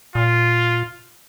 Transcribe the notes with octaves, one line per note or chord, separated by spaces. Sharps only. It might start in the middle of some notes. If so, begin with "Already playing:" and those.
A#2 F4